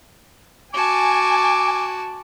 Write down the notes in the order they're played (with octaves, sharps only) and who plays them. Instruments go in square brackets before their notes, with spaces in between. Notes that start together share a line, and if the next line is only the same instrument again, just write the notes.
[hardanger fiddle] F#4 A5 [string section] G#5 [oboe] D6